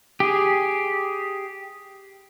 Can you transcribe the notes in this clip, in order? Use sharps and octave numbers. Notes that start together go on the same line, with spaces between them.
G4 G#4